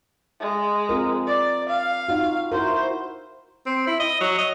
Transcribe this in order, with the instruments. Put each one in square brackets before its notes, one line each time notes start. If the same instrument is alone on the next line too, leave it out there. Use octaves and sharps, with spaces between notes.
[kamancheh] G#3
[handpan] C4 F4 A#4
[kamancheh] D5
F5
[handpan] D#4 F4 F#4
[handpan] E4 F#4 A#4 [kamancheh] C5
[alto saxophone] C4
E4
D#5
F#3
D#5